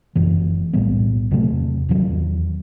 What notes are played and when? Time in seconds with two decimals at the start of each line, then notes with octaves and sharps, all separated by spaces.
0.15 F#1 F#2 E3
0.73 B1 A2 G3 B3
1.31 E2 C3 F#3 A3
1.89 E2 D#3 F#3